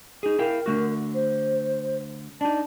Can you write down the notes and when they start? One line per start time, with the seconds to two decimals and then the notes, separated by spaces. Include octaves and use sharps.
0.23 D#4 G#4
0.39 E4 A#4 F5 G5
0.66 D3 A3 F#4
1.14 C5
2.41 D4 D#4 A5